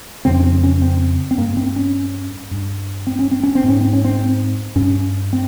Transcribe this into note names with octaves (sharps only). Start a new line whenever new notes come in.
F2 C#3 C4
C#4
C4
C#4
C4
C4
G2 A#3
C4
C#4
G2
C4
C#4
C4
C#4
C4
G#2 C#4
C4
C#4
C4
G2 C#4
C4